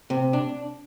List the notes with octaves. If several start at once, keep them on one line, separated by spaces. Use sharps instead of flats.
C3
D4